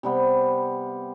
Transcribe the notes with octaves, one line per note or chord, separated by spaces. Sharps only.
C3 G3 B3 C4